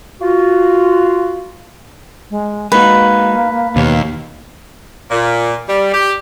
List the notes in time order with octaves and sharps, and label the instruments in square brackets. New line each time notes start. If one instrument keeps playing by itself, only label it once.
[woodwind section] F4 F#4
[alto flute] G#3
[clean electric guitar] G#3 D#4 F#4 [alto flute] A#3 [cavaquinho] B4
[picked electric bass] D#2 [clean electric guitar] B2 B3 C#5
[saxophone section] A#2
G3
G4